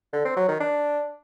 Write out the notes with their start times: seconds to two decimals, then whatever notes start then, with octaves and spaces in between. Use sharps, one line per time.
0.13 D3
0.25 C4
0.37 F#3
0.48 D#3
0.60 D4